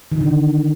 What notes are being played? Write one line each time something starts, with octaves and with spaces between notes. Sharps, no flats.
D#3
D3